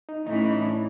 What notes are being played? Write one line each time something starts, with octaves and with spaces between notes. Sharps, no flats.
D#4
A2 E3 A3 C#4 D#4 E4
D#4
D4